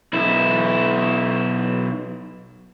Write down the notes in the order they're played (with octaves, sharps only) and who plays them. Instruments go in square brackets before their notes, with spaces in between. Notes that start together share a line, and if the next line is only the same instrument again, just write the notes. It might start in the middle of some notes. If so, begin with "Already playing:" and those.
[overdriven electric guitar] B1 E4